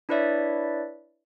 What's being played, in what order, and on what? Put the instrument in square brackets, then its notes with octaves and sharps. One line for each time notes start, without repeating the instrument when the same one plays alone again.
[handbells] D4 E4 B4 C#5 D5 E5